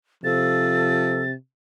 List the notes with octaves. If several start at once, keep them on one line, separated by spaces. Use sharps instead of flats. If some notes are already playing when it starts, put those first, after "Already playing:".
C3 F3 A4 A6